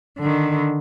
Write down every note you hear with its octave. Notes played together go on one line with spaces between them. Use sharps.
D3 D#3